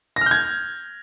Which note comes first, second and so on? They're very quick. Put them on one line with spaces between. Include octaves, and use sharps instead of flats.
A#6 F6 G6 G#6